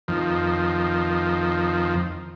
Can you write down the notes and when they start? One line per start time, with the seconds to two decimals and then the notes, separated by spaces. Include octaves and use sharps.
0.08 F2 D#3 F3